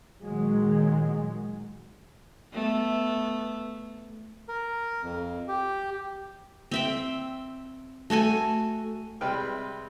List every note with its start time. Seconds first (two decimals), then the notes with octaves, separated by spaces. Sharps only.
0.24 A#2 D#3 F#3 G#3
2.53 A3 B3
4.49 A#4
5.03 F2
5.48 G4
6.71 C4 E5 G5
8.10 A3 F#4 A4 G#5
9.21 C3 G3 G#3 B4 G5 F6